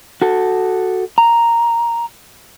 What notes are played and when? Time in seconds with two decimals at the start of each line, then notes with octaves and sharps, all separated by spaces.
0.22 F#4 A4
1.18 A#5